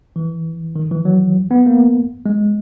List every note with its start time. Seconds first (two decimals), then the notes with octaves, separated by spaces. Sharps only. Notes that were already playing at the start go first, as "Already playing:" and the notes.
0.16 E3
0.76 D#3
0.91 E3
1.05 F#3
1.51 B3
1.66 A#3
2.26 G#3